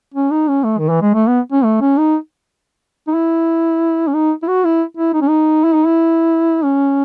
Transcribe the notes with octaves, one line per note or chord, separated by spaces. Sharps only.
C#4
D#4
C#4
A3
D#3
E3
G#3
A3
B3
C#4
A3
C#4
D#4
D#4
E4
C#4
D#4
E4
F#4
E4
E4
D#4
C#4
D#4
E4
D#4
E4
C#4